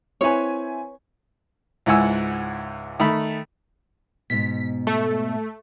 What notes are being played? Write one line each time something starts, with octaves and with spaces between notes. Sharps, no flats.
C4 E4 B4 C#5 G#5
C#2 G#2 E4 F#5 G#5 E6
D#3 A3 B5
G#2 B2 B6
A3